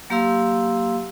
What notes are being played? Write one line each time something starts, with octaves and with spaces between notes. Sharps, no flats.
F#3 A#3 G4 F5 C6 E6